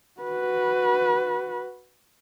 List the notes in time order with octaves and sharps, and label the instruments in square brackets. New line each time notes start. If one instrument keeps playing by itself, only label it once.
[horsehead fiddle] F#4 B4